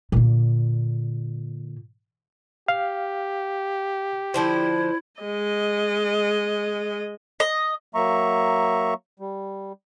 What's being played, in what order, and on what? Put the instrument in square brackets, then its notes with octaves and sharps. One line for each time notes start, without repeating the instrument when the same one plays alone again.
[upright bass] A#2 D3
[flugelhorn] G4 [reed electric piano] F5
[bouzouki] D3 F3 C5 [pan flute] E4
[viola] G#3 D#5
[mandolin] D#5
[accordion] F#3 A#3 E5 A#5 C#6
G3